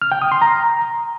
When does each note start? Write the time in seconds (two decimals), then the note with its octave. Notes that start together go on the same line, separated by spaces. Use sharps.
0.02 F6
0.12 G5
0.22 D#6
0.32 C6
0.42 A#5